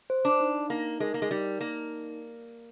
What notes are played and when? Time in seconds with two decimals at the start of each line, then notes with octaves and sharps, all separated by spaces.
0.10 C5
0.25 D4
0.40 D#4
0.70 A#3 D#4
1.00 G#3 A#4
1.14 A#3
1.22 G#3
1.31 G3 D#4
1.61 A#3 D#4